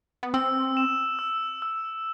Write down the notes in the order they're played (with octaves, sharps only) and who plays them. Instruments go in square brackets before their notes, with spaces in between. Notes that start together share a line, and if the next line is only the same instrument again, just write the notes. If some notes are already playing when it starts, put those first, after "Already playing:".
[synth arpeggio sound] B3
[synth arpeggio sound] C4 [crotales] E6
[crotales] E7
E6
E6